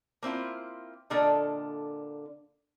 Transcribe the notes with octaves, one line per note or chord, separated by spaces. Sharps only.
A#3 C4 E4 F4
A#2 D3 A#3 D4 A4 D#5